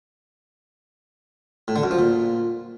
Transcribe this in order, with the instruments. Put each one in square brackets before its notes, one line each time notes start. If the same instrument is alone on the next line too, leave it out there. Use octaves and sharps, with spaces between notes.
[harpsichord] A2
D3
F#2
F3
A#2